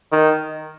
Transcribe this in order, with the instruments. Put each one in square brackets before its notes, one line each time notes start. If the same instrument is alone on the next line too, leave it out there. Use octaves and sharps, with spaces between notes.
[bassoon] D#3